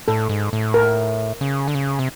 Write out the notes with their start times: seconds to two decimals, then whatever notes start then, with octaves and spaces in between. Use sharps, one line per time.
0.08 A2 A4
0.29 G#2
0.53 A2
0.74 A#4
1.41 C#3
1.68 D3
1.75 C#3
1.99 C3